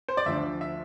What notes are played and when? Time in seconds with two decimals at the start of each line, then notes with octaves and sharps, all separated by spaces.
0.09 C5
0.17 D5
0.26 D2 D3 F3 E5
0.61 E5